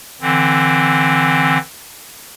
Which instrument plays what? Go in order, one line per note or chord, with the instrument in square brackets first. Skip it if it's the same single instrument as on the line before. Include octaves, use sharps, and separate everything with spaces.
[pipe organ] D3 E3 C4